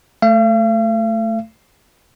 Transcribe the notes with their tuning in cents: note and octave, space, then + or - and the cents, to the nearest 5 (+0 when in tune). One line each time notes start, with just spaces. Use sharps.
A3 +0 F5 -45